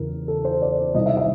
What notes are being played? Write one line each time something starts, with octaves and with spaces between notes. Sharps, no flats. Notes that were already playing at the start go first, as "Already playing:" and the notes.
Already playing: E2 C#3 E3 A#4
A4
C5
D5
C2 C3 D#3 D#5
E5
E5